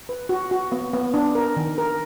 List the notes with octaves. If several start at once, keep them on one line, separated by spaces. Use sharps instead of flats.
B4
F#4
F#4
B3
B3
D4
A#4
D#3
A#4